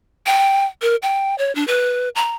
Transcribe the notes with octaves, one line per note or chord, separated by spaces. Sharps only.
G5
A#4
G5
C#5
D4
B4
A#5